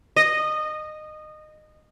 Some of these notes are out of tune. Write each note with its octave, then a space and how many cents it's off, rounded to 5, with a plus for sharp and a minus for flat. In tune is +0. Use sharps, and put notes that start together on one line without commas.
D#5 -20